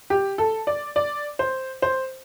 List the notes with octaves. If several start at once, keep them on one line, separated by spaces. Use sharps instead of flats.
G4
A4
D5
D5
C5
C5